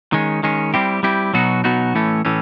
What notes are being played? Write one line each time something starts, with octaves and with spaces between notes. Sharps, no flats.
D#3 G#3 C#4
D#3 G#3 C#4
G3 C4 E4 G4
G3 C4 E4 G4
B2 F#3 B3 D#4 F#4
B2 F#3 B3 D#4 F#4
A2 E3 A3 C#4
A2 E3 A3 C#4